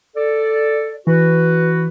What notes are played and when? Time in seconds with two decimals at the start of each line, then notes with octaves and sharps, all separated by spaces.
0.16 A4 D5
1.07 E3 F#4 B4